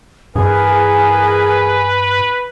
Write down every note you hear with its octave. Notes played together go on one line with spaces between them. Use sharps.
G2 E3 G#4 A#4 B4 G#5